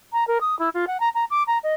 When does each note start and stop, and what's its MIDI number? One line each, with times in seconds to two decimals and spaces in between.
0.13 0.26 82
0.27 0.38 70
0.41 0.58 87
0.59 0.69 64
0.74 0.85 65
0.87 1.00 78
1.00 1.09 82
1.15 1.24 82
1.30 1.43 86
1.47 1.58 82
1.63 1.75 75